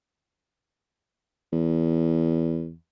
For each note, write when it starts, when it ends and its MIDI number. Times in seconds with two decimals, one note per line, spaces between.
1.53 2.74 40